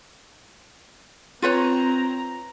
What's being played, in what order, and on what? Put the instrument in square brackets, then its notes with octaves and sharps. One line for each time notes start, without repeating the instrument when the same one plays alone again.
[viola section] C4 A#5 [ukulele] F4 B4 C#5